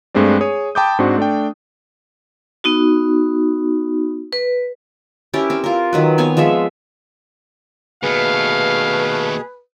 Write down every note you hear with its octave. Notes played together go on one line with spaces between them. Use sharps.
G2 G#3 A3 C4 D4
G#4 C#5 D#6
G5 A5 B5 D6 D#6 G6
G#2 C4 D4 F#4
A3 D4 G5
B3 D#4 F#4
B4
C#4 E4 G4 A#4
C4
F4 A#4
D#3 F#3 B4
B3 C4 C#5 G#5
F3 G#3 G#4 E5
D#2 B2 A3 G#4 B4 F5